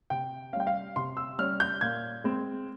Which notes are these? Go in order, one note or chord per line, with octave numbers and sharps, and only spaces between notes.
C3 G5
G3 C#4 F5 G5
F5
C3 C6
E6
G3 C#4 F6
G6
A#2 G#6
G#3 C4